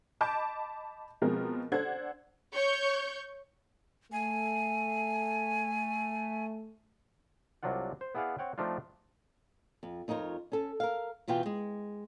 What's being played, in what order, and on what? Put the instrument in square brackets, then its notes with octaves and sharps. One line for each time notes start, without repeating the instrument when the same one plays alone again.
[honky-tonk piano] D#5 A5 B5 D6 G6 D7
B2 F3 G#3 C4 A#4
D4 A4 C5 F#5 G#6
[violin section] C#5 C#6 G6
[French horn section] A3 [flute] G#5
[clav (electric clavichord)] C2 C3 F#3 D4 F4 F#5
C5
B3 E4 G#4 D5 F5 F#5
C4 C#5 F#5 G5
F3 A3 C4 D4 D#4 F4
[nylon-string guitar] F2
F2 D#4 F4 A#4 C#5
C#4 A4
A#4 F5
E2 B2 E3 F4 G5
G#3